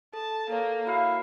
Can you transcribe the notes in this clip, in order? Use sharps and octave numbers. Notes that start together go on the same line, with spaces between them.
A4 A5
A#3 A4 C#5
E4 F#4 C#5 F5